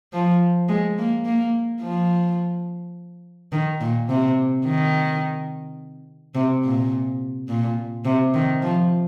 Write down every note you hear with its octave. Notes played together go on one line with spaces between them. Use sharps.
F3
G#3
A#3
A#3
F3
D#3
A#2
C3
D#3
C3
A#2
A#2
C3
D#3
F3